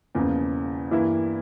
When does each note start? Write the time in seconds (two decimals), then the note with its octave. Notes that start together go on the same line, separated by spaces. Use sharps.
0.15 E1 E2 C#3 F3 A#3
0.91 G2 E3 A#3 E4